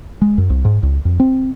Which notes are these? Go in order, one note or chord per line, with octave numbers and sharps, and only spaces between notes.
G#3
F#2
C2
G#2
C#2
F2
C4